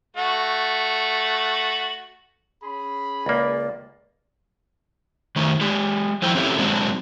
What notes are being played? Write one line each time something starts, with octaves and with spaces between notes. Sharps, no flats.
A3 F#4
C#4 G#4 B5
C#2 A#3 D5
D#3 A3 D#4
G#3 G4
F3 A3 E4 C5 G5
C4 C#4 E4 G4 A4 E5
F#3 G#3 C4 D4 D#4